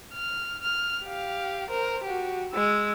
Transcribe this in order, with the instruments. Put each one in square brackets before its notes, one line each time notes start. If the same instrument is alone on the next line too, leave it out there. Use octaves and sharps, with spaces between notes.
[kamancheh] F6
F6
G4 F5
A#4 C5
F#4 G4
G#3 E6